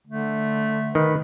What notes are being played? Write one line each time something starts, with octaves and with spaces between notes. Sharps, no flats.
D3 A3
D#3 B4